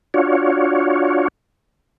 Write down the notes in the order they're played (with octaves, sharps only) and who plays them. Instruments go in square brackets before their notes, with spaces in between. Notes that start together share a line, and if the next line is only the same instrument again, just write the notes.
[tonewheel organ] D4 F4 F#4 C#5